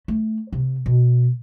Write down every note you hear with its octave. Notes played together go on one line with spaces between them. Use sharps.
A3
C3
B2